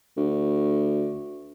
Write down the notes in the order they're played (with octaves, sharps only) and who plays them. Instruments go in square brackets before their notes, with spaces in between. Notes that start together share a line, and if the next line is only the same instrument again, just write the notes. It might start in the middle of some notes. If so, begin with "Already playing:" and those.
[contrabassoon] D2